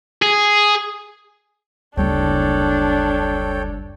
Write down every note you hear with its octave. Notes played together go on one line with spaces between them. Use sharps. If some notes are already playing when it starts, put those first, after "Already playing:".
G#4
F#1 D2 G3 B3 D4 A4 C#5 G5